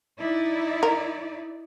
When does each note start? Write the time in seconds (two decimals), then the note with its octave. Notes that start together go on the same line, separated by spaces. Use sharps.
0.19 D#4 E4 D5
0.83 A#4